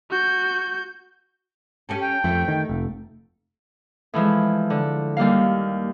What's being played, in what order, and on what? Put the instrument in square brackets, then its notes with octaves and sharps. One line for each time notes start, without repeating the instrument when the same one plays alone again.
[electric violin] F#4 G6
[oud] C#4 G4 A4
[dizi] G5
[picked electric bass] F2 [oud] A3
[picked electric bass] D#3
F1
[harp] A2 E3 F3 G#3
D3
D#2 G3 A#3 F5